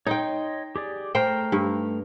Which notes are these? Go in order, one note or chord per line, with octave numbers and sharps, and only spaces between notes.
D#4 C#5 D#5 G5 C6
G4 G#4 D5
A3 C5 G5 A#5 F6
G2